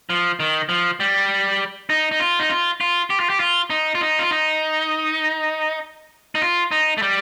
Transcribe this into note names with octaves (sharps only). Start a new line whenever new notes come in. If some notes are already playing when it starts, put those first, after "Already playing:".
F3
D#3
F3
G3
D#4
D#4
F4
D#4
F4
F4
G4
F4
G4
F4
D#4
F4
D#4
F4
D#4
D#4
F4
D#4
A3
G3